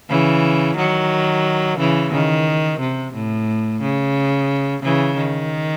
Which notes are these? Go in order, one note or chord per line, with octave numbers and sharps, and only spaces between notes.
C#3 E3
D#3 F#3
C#3 E3
D#3
C3
A2
C#3
C#3 E3
D#3